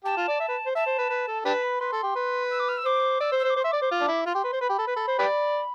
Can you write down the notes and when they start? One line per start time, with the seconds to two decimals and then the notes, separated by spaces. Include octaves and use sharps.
0.04 G4 A5
0.17 F4
0.28 D5
0.40 E5
0.49 B4
0.66 C5
0.75 E5 A5
0.86 C5
0.98 B4
1.10 B4
1.28 A4
1.45 D4 G4 B4 A5
1.62 B5
1.80 B4 C6
1.92 A4
2.03 G4
2.15 B4
2.50 E6
2.59 D6
2.68 F6
2.77 E6
2.85 C5 D6
3.20 D5 E6
3.32 C5
3.39 E6
3.44 C5
3.49 D6
3.56 C5
3.60 E5 C6
3.71 D5 D6
3.82 C5
3.91 F4
4.01 D4
4.08 E4
4.26 F4 C6
4.35 G4
4.44 B4
4.53 C5
4.61 B4 B5
4.69 G4
4.79 A4
4.87 B4
4.96 A4
5.08 C5
5.19 G4 B4 D5